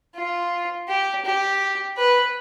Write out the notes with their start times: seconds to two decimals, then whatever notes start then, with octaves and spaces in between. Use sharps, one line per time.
0.15 F4
0.88 G4
1.25 G4
1.98 B4